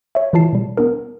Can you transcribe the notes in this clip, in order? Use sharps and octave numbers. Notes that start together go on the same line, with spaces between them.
C#5 E5
E3 E4 F4 A5 C7
B2 G3
B3 D4 A#4